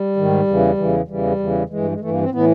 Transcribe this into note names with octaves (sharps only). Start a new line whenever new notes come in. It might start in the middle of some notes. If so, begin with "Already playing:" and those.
Already playing: G3
G#2 D#3
E2 C#3 E3
E2 C#3 E3
E2 C#3 E3 G3
E2 C#3 E3
G2 E3 G#3
G#3
G2 E3 A3
A#3
C4
A2 E3 B3